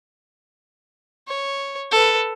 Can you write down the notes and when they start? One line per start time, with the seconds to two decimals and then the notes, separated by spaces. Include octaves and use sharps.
1.28 C#5
1.92 A4 B4